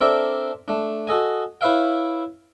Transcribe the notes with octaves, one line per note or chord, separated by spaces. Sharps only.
C4 D4 A4 A#4 D5 E5
A3 D4
F#4 A4 D#5 G#5
E4 B4 C#5 E5 F5 G5